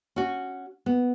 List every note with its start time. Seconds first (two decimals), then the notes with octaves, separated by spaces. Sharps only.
0.16 C#4 F#4
0.86 B3